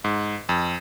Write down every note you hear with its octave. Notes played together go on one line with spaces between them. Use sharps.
G#2
F2